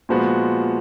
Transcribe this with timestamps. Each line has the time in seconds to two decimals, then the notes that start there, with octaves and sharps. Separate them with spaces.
0.09 A#2 F3 G#3 B3 F#4